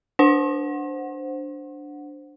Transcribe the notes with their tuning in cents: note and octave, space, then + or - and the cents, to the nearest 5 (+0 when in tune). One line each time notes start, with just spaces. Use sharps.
D4 +0 C5 +0 F#5 -10